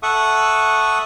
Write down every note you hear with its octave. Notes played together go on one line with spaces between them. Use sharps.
A4 E5 F#5 C#6 D#6